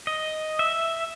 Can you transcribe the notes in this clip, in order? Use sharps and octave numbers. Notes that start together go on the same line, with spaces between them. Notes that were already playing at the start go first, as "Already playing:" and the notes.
D#5
E5